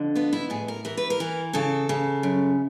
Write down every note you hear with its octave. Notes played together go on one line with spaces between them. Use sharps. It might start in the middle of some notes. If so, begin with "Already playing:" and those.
Already playing: F2 D3
B3 F4
E4
A2 G#4
A#4
E3 A#4
B4
A#4
E3
C#3 A4
C#3
F#2